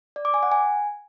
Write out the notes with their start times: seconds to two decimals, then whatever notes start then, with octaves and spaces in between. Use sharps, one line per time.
0.16 D5
0.25 D6
0.34 G#5
0.43 F#5
0.52 G#5